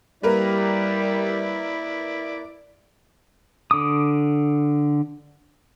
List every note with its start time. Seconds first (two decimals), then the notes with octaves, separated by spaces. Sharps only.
0.23 G3 A#3 E4 A#4 B4 D5
3.71 D3 D6 D#6